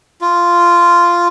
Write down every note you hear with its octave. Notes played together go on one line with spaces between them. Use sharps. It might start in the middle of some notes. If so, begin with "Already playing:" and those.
F4